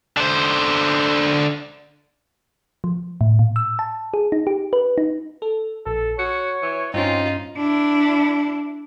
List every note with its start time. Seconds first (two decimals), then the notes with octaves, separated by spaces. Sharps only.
0.17 D3 C5
2.84 F3
3.21 A2
3.39 A#2
3.56 E6
3.79 A5
4.14 G#4
4.32 D#4
4.47 G4
4.73 B4
4.98 D#4
5.42 A4
5.86 A#1 A4
6.19 F#4 C#5 C#7
6.63 E3
6.94 G2 C4 C#4 D#4 F4
7.57 D4 E4